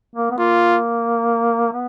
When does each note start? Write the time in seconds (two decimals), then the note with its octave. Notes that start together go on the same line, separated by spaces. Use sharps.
0.16 A#3
0.31 B3
0.38 A#3 F4
1.73 B3